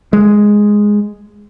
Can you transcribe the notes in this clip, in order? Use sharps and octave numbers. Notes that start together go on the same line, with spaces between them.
G#3